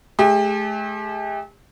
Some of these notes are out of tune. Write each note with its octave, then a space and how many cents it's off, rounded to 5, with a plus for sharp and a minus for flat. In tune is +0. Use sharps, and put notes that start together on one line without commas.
A3 -40 G4 +35